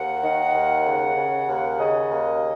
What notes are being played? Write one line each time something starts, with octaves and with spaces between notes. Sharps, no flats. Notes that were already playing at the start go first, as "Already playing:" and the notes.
Already playing: D#2 F#5
D#3
D#2
C#3
C#3
D#2
C#3 D#5
D#2